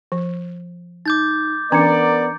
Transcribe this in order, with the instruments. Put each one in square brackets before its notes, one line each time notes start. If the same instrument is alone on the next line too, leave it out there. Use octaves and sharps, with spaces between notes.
[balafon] F3
[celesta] D#4 [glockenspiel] D6 G6 A6
[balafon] E3 C#4 D4 [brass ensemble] B3 A#4 D5 [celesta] A#5 C#7